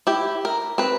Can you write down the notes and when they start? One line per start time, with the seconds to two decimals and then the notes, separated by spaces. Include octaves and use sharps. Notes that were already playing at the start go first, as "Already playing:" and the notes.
0.07 E4 G4
0.45 A#4
0.78 C4 B4